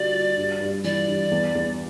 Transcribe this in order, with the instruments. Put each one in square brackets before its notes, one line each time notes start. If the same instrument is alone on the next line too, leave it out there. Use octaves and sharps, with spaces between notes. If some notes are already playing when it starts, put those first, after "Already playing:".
Already playing: [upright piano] D3 G3 F#4 [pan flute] D5
[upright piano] F#4
G2
G2
[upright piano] E3 [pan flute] D5
[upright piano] G2
E2
E2